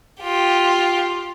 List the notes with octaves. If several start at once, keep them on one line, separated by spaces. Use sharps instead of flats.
F4 G4